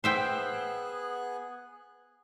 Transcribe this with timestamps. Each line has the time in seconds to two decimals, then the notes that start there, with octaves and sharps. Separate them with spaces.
0.04 B3 G#4 C5 E5 G5 F#6